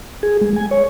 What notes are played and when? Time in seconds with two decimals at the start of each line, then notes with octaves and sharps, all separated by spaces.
0.23 G#4
0.41 G#3
0.56 G#5
0.71 C#5